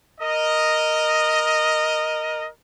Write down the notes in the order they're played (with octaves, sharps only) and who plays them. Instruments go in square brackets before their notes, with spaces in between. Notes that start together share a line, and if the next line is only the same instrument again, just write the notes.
[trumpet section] A#4 D#5